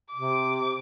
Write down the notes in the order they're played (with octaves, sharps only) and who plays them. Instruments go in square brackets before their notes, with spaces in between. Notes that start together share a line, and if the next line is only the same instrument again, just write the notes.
[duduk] C3 [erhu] D6